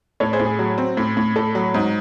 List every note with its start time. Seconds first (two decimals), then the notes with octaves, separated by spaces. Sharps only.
0.20 A2 A4 C#5
0.33 G#4 C5
0.39 A2
0.46 G#4
0.59 F#3
0.78 C4
0.97 A2
1.17 A2
1.36 A2 A4
1.55 F#3
1.74 G#2